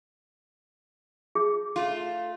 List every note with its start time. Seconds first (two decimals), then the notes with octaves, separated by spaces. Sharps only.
1.35 G#4
1.76 A3 F4